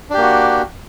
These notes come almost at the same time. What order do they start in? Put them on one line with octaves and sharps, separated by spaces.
D4 G4 A#3 F#4